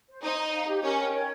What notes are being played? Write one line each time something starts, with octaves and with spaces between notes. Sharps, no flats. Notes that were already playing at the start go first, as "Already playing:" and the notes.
C5
D#4 C5
A#5
F5
G4
C#4 A#4
G5
C#5